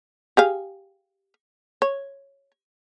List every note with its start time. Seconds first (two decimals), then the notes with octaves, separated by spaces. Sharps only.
0.37 G4 G#4 F5
1.82 C#5